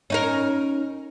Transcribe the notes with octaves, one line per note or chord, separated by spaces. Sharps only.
C#4 D#4 A#4